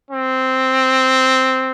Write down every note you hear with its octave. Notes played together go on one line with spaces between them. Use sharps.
C4